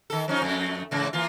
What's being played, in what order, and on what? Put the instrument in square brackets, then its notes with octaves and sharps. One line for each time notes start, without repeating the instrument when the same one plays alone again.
[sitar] D#3 A4
F3 C#4 D#4
F2 A3
G#2 C#3 E3
E3 A#3 F4